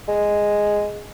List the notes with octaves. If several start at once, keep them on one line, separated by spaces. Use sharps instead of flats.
G#3